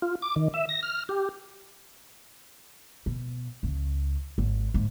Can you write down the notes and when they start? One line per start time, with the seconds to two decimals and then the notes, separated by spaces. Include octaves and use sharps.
0.02 F4
0.22 D6
0.36 D#3
0.54 E5
0.69 A#6
0.83 F6
1.09 G4
3.06 B2
3.63 C#2
4.38 G#1
4.74 G#2